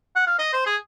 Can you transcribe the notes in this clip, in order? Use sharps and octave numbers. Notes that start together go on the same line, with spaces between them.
F#5
F5
D#5
C5
G#4